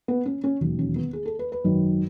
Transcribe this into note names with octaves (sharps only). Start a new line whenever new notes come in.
B3
C#4
C#4
E1 D#2 D#3 F#3
C#4
B3
G#4
A4
B4
B4
G#1 F#2 D#3